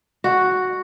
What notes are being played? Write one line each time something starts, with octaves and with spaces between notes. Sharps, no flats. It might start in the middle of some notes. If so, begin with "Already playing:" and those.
F#4